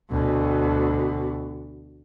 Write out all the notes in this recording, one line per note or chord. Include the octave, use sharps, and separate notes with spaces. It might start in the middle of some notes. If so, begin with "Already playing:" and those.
D2 B2